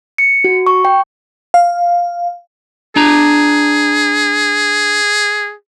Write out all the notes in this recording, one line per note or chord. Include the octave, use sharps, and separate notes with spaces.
C#7
F#4
C#6
G5
F5
D4 G#4 A#5